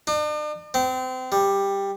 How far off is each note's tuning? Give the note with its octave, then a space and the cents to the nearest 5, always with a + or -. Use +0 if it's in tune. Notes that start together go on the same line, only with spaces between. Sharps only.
D4 +45
C4 -30
G3 +10